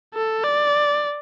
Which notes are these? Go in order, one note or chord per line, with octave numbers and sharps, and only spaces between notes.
A4
D5